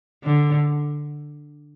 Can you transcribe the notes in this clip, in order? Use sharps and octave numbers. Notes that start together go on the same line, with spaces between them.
D3